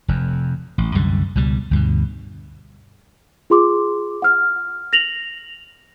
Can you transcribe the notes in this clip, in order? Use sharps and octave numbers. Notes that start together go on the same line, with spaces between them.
F1 F2
A1
C2 F#2 D3 G3
C#2 B2 G3
D2 G2 B2
F4 G#4 C6 D6
F#5 F6
A#6 F7 F#7